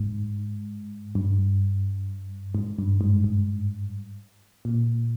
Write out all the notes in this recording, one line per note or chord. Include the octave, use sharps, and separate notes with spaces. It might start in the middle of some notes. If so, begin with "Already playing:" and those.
Already playing: G#2
G2
G#2
G2
G#2
G#2
A#2